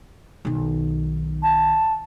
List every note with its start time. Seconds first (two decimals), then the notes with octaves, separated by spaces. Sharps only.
0.45 B1 D#3
1.43 A5